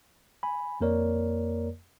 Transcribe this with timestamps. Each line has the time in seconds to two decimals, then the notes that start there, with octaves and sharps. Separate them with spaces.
0.43 G#5 B5
0.81 F2 A#3 A#4 C#5 D5